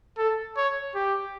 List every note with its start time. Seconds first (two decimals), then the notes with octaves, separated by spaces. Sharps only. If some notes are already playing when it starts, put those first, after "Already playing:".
0.18 A4
0.57 C#5
0.95 G4